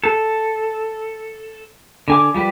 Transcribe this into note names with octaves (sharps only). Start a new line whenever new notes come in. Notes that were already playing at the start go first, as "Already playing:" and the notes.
A4
D3 G#5 D6
F3 G3 G4 B4